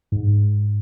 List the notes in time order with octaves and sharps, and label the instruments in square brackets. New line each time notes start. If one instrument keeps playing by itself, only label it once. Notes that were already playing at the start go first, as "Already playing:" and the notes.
[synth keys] G#2